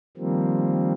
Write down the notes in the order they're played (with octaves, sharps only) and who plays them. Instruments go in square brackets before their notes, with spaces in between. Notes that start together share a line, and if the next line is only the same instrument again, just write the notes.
[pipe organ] D#3 F3 G3 A#3 C4